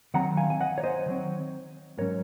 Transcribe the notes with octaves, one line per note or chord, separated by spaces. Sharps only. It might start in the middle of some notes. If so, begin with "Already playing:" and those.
D#3 F#3 C4 F#5 A#5
F5 G#5
G#5
D#5 F#5
C#5
C5 D#5
D#3 F#3 C4
G#2 F#3 C#4 A#4 C#5